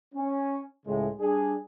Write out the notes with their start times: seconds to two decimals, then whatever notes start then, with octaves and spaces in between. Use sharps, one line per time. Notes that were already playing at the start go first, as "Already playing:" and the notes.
0.14 C#4
0.85 C#2 A2 C#3 G#3
1.18 G3 D4 G#4